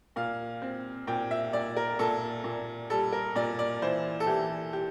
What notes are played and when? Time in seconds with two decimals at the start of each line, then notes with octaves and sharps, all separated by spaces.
0.16 A#2 F5
0.62 C4
1.07 A#2 G5
1.31 E5
1.53 A#2 D5
1.76 A#4
1.99 A#2 A4
2.44 A#2
2.90 G3 A4
3.12 A#4
3.35 A#2 D5
3.59 D5
3.82 E3 C5
4.20 A4
4.27 E3 G4
4.73 G4